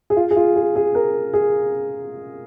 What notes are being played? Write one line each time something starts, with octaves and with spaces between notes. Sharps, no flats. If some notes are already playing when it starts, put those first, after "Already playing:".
G#4
F4
G#4
F4
G#4
G#4
A#4
G#4